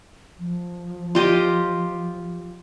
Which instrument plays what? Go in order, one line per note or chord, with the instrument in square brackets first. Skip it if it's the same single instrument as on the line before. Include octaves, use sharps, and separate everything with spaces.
[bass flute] F3
[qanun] F4 G4 D#5